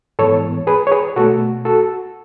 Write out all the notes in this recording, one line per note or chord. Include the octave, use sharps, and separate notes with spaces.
G#2 E3 B3 A4 C#5
G#4 B4
C#5
G#4 B4
B2 A3 F#4 A4
F#4 A4